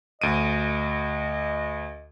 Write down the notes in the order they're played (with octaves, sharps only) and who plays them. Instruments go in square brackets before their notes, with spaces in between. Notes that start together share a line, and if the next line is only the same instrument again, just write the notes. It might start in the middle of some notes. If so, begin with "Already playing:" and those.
[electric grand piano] D2 D7 D#7 [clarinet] D#5